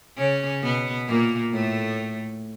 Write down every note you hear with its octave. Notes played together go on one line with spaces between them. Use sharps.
C#3 C#4
B2 B3
A#2 A#3
A2 A3